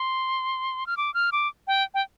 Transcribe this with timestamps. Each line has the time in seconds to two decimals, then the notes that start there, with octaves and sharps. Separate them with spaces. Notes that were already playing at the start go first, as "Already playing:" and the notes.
Already playing: C6
0.87 F6
0.97 D6
1.14 F6
1.32 D6
1.67 G5
1.94 G5